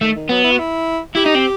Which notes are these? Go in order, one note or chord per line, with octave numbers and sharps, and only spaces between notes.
D#3 A3
D#3
F#3 B3
E4
F#4
E4
E4 G4
D#4
C4